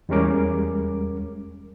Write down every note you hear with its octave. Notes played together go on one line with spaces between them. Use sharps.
E2 G3 G#3 C#4 A#4 D6